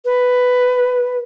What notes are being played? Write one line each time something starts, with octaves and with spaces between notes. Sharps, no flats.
B4